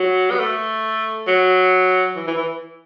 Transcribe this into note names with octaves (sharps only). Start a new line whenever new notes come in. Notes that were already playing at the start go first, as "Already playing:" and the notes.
Already playing: F#3
B3
A3
F#3
E3
E3
E3